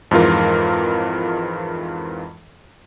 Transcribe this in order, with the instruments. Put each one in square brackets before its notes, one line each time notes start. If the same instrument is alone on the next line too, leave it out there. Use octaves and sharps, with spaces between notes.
[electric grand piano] F2 G#2 E3 F4 A#4